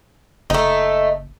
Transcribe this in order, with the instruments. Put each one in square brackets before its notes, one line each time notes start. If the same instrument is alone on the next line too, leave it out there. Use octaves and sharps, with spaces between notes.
[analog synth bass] F#1 [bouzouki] A3 D#4